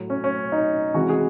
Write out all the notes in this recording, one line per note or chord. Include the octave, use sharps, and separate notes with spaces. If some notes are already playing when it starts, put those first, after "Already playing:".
Already playing: A2 F#3
C#4
C#4
D#4
C3 E3 G#3 F#4
G#4